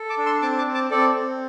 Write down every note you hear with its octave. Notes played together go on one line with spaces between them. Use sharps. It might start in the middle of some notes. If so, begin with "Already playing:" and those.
Already playing: A4
A5 D6
D4
C6 E6
C4 A5 D6
A5 D6
C4
A5 D6
C4 A4 D5
C4